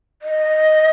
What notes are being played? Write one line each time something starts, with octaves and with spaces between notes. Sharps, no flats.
D#5